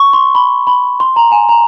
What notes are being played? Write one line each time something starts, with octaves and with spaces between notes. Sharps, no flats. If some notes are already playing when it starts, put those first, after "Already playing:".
Already playing: C#6
C6
B5
B5
C6
A#5
G#5
A#5